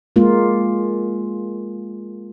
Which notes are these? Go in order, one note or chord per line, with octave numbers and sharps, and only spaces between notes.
G#3 A#3 F4